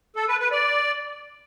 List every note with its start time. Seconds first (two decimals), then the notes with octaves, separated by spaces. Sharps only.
0.16 A4
0.28 B4
0.40 B4
0.51 D5